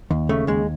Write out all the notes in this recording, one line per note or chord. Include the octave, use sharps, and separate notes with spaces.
D#2
C#3 A3
D#2 G#3